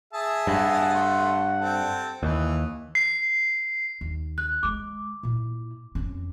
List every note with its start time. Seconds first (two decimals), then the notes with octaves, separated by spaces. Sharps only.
0.13 G#4 E5 A5
0.47 G2 F#5
0.94 A3 C6
1.61 C4 A4
2.23 D#2 E3
2.95 C7
4.01 D#2
4.38 F#6
4.63 D3 G#3 D6
5.23 A#2 E4
5.95 F2 C#4